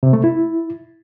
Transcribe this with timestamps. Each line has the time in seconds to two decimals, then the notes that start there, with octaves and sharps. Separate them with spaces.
0.03 C3
0.13 A3
0.24 E4